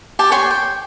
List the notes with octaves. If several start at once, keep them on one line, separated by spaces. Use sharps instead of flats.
G4 G#5 A5
C#5 G5 G#5 C6
G5